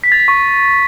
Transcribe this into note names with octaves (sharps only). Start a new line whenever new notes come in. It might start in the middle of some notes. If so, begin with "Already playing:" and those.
B6
A6
B6
C#6